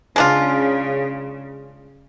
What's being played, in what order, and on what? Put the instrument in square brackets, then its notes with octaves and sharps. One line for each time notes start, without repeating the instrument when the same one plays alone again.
[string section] C#3 [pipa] G#3 D4 F4